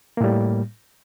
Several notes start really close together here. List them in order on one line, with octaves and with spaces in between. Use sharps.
A#3 A2 G3